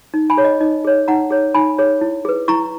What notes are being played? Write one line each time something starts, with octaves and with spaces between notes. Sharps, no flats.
D#4
G#5 B5
G#4 C#5
D#5
D#4 D#5
G#4 C#5
D#4 F#5 A#5
G#4 C#5
D#4 G#5 B5
G#4 C#5
E4
G#4 B4
E4 A#5 C#6